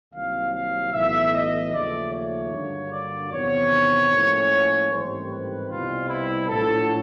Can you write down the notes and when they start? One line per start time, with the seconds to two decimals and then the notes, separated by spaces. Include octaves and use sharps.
0.13 C2 C3 D#3 F#3 A#3 F5
0.53 F5
0.93 B1 A2 E3 E5
1.33 D#5
1.72 D#2 C#3 F3 A3 D5
2.13 C#5
2.52 G2 D3 F#3 A#3
2.92 D5
3.31 E2 C3 D#3 F#3 B3 C#5
4.10 A2 F3 A#3 C#4
4.90 A1 G#2 D#3 G3 C4 C5
5.30 B4
5.69 C2 B2 G3 C4 F4
6.09 E4
6.48 A#1 A2 F#3 A4